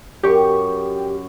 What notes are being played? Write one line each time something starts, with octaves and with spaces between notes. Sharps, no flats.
F#2 G4 C#6